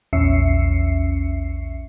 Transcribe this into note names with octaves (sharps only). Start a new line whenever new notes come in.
A#1 E2 C#4 E5 C7 C#7